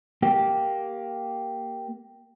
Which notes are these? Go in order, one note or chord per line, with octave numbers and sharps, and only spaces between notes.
A#3 G4